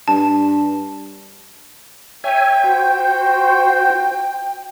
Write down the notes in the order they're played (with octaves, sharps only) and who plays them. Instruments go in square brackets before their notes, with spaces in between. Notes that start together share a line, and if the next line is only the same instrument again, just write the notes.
[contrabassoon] G2 [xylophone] A5
[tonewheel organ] C#5 E5 G#5 [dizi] G5
[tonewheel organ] F#4 C5